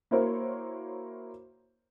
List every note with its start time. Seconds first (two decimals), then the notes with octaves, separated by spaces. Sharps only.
0.11 A#3 E4 F#4 A#4 C5 C#5